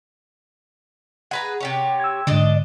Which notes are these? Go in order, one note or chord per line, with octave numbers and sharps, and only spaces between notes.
G#4 B4 F#5 A#5
C3 G4 C#5
E6 G#6
G#2 D3 D4 D5 D#5